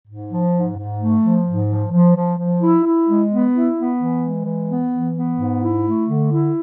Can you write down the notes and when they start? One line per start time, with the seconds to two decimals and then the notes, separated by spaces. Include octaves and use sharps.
0.08 G#2
0.31 F3
0.55 G#2
0.78 G#2
1.01 A3
1.23 F3
1.47 G#2
1.69 F3
1.92 F3
2.15 F3
2.38 F3
2.62 E4
2.85 E4
3.08 G#3
3.31 B3
3.54 E4
3.76 B3
3.99 E3
4.23 G#3
4.45 E3
4.69 B3
4.91 E3
5.14 B3
5.37 G#2
5.60 E4
5.84 A3
6.06 D3
6.30 E4